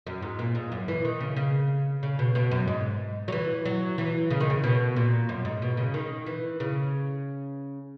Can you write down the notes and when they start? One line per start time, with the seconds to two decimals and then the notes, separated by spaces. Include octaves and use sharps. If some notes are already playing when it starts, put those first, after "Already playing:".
0.07 F#2
0.22 G#2
0.39 A#2
0.55 G#2
0.72 F#2
0.88 E3
1.05 D#3
1.20 C#3
1.36 C#3
2.03 C#3
2.19 B2
2.35 B2
2.51 F#2
2.67 G#2
3.28 F#3
3.32 E3
3.66 F#3
3.98 E3
4.31 C#3
4.40 D#3
4.50 C#3
4.64 B2
4.96 A#2
5.29 F#2
5.45 G#2
5.62 B2
5.77 C#3
5.94 D#3
6.26 E3
6.60 C#3